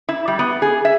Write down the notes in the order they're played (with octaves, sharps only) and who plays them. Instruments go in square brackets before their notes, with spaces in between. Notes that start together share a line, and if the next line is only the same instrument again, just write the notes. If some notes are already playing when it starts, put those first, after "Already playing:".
[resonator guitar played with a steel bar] E4
G3
B3
G#4
E5